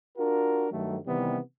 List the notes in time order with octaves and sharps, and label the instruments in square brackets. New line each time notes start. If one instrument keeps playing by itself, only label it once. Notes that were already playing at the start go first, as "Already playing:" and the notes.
[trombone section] D4 F4 F#4 A#4
G2 D#3 F#3 A3
C3 D#3 E3 G3 B3